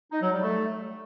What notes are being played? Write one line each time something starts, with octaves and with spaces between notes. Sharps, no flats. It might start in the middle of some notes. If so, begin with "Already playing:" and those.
D#4
F#3
G3
A3